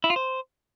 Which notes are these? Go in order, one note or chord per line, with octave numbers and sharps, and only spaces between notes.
E4
F4
C5